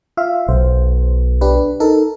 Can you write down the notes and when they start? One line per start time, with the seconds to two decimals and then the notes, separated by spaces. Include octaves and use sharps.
0.17 F4 E5 F5
0.48 B1 C5
1.41 D4 G4 B4
1.80 D#4 A4 A#4